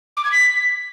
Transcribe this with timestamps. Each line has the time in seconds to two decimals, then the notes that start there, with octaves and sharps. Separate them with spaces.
0.17 D6
0.24 G#6
0.32 B6